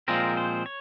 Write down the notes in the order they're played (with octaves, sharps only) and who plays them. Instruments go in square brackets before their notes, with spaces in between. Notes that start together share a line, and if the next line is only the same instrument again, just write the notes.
[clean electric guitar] A#2 F3 G#3 C4 [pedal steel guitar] A#4
[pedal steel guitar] C5
C#5